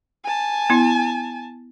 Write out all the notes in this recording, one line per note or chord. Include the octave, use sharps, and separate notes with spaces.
G#5 A5
B3 E4